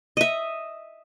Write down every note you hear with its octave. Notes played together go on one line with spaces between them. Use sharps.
D#5 E5